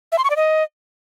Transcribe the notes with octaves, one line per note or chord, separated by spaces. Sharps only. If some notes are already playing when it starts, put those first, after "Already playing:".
E5
C6
C#6
D5
D#5